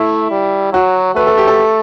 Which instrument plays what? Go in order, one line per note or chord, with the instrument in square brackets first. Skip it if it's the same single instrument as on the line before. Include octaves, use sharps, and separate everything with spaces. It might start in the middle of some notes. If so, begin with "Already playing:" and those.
Already playing: [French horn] A3 [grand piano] E4
[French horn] G3
[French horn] F#3 [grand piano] F#4
[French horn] A3 [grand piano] B4
[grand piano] A4
G4
A4